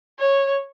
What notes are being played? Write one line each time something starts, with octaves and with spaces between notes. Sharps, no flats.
C#5